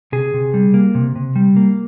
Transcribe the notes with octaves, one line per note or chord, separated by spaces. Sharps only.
C3 G#4
C3
G3
A#3
C3
C3
G3
A#3